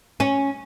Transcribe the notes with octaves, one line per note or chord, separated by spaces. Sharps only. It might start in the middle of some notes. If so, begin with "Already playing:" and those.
C#4